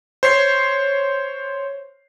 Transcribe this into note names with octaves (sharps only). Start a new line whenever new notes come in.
C5 C#5 C7